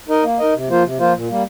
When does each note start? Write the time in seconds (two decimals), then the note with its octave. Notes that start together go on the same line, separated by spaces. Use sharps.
0.08 D#4 A#4 D#5
0.24 A#3
0.39 D#4 A#4 D#5
0.53 C3
0.69 F3 A#3 F4 C5
0.83 C3
0.98 F3 A#3 F4 C5
1.13 A#2
1.28 G3 A#3